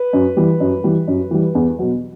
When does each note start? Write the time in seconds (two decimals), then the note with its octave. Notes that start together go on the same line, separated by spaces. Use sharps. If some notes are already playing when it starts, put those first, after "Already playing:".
Already playing: B4
0.13 F#2
0.37 E3 G3
0.60 F#2
0.84 E3 G3
1.08 F#2
1.31 E3 G3
1.55 E2
1.79 B2 F#3